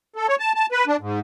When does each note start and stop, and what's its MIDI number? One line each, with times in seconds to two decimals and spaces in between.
0.16 0.27 69
0.28 0.36 73
0.40 0.52 81
0.55 0.66 81
0.72 0.85 71
0.87 0.96 62
1.01 1.20 44